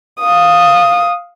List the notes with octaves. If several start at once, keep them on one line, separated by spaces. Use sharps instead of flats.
F5 D#6